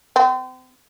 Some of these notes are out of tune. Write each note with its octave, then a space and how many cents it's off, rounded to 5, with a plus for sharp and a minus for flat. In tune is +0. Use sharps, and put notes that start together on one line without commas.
C4 -35